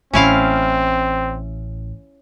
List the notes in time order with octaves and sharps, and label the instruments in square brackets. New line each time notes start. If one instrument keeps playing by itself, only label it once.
[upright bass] A1 A2 [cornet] C4 [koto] C#4 E4 F5